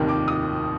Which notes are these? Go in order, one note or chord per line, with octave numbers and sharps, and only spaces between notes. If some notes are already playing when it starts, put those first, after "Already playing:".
Already playing: F1 D#2 D#3
D6
D#6